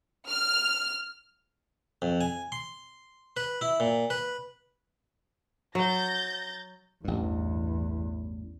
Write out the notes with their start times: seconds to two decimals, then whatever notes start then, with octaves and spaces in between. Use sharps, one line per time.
0.29 F6
2.02 F2
2.21 G#5
2.52 C6
3.37 B4
3.61 E4
3.80 A#2
4.10 B4
5.75 F#3 G6 A6 A#6
7.05 A1 E2 G2